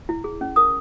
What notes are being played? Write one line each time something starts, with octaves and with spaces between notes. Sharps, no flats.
E4
G#4
C#4
A#4 D#6